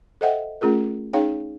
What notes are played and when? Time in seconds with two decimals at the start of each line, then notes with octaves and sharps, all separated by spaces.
0.21 A4 C5 D#5 E5 F#5 G5
0.61 A3 C#4 F4 G#4 A#4
1.13 C#4 D#4 G#4 C#5 F5 G5